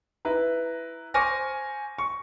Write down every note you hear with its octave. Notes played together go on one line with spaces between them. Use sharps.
E4 B4 A#5
C5 G#5 C#6 D6 F6 A#6
C#6